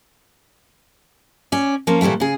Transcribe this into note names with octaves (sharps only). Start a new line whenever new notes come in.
C#4 D5
F3 A#3 C#4 F4
A#2 E3 G3 A3 E4
C#3 G#4